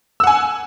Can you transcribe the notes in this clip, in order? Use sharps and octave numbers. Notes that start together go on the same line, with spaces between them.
F#5 G#5 E6